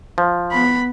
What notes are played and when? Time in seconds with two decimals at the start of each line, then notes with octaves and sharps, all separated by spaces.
0.18 F3
0.51 B3 B5